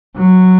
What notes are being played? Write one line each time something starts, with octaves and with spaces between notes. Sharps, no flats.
F#3